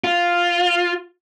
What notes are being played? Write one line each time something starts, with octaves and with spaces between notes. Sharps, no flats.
F4